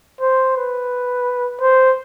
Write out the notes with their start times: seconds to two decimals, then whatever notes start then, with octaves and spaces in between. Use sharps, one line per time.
0.21 C5
0.57 B4
1.61 C5